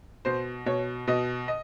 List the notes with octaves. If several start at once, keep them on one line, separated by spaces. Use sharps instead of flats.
B2 C5
B2 C#5
B2 D#5
D#5